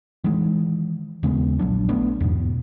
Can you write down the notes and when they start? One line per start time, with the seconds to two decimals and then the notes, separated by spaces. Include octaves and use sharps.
0.24 D#3 E3 G#3
1.23 D#2 C#3 G#3 B3
1.59 A#1 F#3 D4
1.89 A3 B3 D4
2.20 E2 G#2 B2